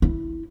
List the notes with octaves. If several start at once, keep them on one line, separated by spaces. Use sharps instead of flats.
E4